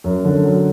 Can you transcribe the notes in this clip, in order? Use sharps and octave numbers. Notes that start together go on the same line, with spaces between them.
F#2
D3
F#3